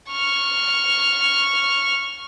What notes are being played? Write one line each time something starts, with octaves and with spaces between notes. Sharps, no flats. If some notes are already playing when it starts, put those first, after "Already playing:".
C#6 F6